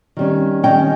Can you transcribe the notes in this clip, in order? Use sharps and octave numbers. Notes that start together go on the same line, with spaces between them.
D#3 G3 C#4
D#3 G3 C#4 D#5 G5